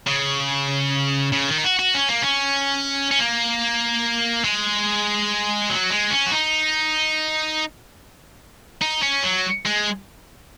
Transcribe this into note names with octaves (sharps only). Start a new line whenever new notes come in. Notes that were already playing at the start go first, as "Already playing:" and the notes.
C#3
C#3
D#3
D#4
F#4
F#4
C#4
A#3
C#4
C#4
A#3
G#3
F#3
G#3
C#4
F#4
D#4
D#4
C#4
F#3
G#3